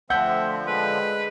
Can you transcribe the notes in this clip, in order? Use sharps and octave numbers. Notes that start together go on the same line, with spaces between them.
D3 F3 A3 C4 E5 F#5 G6
G#3 B4